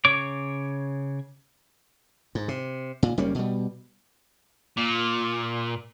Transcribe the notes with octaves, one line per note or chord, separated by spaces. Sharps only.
C#3 C#5 C#6 D6
G#2
C3
A#2
F#1 G3 A#3 C#4
B2 G3
A#2